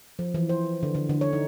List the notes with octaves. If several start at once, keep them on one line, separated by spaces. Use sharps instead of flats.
F3
E3
C5
D3
D3
D3
C#5
D#4